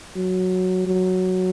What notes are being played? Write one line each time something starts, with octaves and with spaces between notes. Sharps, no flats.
F#3
F#3